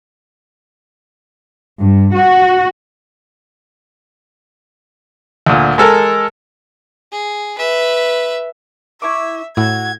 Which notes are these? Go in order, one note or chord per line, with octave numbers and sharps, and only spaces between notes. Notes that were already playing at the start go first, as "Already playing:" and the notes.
G2
F#4
D2 A#2
G#3 A4 A#4
G#4
B4 E5
E4 E5 C#6 D6
A2 F#4 E6 G#6